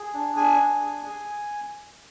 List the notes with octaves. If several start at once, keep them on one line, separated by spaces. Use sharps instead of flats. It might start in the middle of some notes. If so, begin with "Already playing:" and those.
Already playing: G#4
D4
G#4 G#5
D4
G#4
G#4